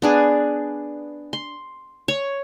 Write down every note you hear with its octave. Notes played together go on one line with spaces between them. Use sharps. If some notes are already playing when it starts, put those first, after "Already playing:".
B3 D4 G#4
C6
C#5